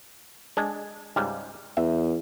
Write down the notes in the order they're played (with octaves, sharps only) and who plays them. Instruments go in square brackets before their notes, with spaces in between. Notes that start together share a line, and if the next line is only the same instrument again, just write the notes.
[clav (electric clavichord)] G#3 D4
C#2 G#2 G3
[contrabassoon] E2 [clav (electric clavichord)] E5